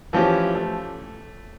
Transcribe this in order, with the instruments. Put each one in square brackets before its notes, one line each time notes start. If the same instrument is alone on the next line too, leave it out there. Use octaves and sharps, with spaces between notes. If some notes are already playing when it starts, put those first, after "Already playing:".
[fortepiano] E3 F3 C#4 G4
A3